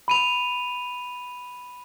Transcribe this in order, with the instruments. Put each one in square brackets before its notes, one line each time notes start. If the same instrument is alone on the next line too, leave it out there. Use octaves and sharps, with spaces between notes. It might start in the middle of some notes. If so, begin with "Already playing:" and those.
[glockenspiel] B5 D#7 F7